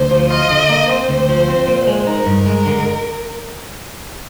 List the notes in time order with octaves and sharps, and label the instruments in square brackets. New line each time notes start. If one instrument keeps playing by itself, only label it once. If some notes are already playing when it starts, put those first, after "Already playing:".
Already playing: [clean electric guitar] D2 [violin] C5
[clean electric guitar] F3
[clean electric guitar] F4 [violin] D#5
[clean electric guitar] D3
A#3
[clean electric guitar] C4 [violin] C5
[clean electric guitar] D2
F3
C4
A#2
G#3
[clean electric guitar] D#4 [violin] A#4
[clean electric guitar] G2
G#3
D3